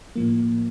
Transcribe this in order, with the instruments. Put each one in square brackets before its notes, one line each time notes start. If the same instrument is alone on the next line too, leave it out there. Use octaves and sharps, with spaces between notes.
[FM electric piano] A2 F3 A#3